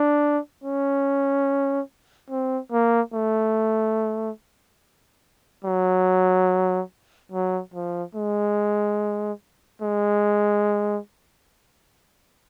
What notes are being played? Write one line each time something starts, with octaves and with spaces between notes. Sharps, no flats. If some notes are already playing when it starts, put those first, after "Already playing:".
Already playing: D4
C#4
C4
A#3
A3
F#3
F#3
F3
G#3
G#3